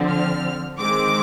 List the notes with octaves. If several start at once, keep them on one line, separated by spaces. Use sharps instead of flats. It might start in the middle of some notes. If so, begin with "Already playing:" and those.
Already playing: D3 F3 C4
F6
D#3 G#3 C4 D6